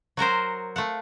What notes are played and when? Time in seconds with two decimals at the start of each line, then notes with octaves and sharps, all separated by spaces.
0.17 F#3 F#4 A#4 C5
0.76 A3 F5 F#5